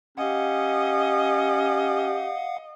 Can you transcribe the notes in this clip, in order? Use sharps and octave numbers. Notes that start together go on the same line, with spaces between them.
C#4 G4 D#5 F5 F#5